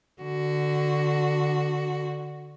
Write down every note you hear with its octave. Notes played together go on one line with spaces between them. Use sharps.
D3 F#4